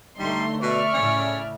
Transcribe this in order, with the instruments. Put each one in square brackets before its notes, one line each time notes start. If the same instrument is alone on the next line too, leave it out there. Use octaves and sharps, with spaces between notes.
[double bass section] D3 A3 [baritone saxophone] G3 [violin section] D#4 C6
[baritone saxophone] B2 [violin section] D5 E5 F6 [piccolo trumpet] C#6
[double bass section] A2 C#3 [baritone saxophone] C#4